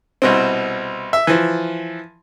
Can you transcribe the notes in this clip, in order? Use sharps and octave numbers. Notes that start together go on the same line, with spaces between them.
C2 B2 C4
E5
E3 F3